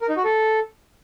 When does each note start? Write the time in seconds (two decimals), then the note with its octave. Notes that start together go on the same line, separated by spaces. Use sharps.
0.01 A#4
0.09 D#4
0.17 F#4
0.24 A4